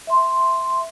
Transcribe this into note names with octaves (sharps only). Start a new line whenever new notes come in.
E5 C6